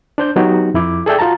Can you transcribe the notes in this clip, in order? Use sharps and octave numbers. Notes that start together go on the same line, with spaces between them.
D4 C5 G6
F#3 B3 D#4 F#4 G4
F2 E4 D6
G#4 A4 D5 E5 G5
F4 F#4 A5 A#5